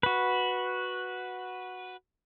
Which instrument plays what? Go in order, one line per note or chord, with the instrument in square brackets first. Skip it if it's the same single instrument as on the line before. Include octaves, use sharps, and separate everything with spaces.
[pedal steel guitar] F#4 B4